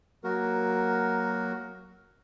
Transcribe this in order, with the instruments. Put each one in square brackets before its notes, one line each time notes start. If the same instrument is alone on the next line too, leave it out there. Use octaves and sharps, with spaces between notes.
[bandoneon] F#3 A#3 F#4 A#4